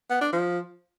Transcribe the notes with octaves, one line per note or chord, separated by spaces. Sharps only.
B3
D4
F3